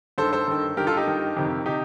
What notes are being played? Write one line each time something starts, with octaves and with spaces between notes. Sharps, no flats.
G2 D#3 A4 C5
A4 C5
G2 D#3
G2 D#3 G4 A#4
F4 A4
D#4 G4
G2 D#3
F2 C3 D#3
C3 D#4 G4